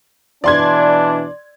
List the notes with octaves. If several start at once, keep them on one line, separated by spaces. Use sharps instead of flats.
B2 E3 D4 D5 C6 G#6